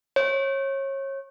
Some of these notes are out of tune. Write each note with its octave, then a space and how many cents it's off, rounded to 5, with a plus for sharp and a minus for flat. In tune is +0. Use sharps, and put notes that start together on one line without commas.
C#5 -30